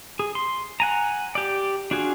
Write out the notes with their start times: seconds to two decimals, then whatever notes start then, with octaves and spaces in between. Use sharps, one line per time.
0.19 G#4
0.35 C6
0.80 F#5 G#5 A#5
1.35 G4 D5
1.91 D4 F4 F#4 G#4